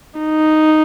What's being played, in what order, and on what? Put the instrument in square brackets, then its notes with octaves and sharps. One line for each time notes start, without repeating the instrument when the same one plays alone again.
[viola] D#4